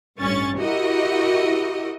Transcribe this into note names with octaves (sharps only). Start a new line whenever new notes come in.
A1 G2 C#4 C#6 A6
E4 F#4 G4 A#4 D#5